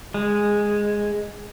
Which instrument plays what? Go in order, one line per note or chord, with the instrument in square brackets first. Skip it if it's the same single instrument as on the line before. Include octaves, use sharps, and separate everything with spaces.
[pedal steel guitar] G#3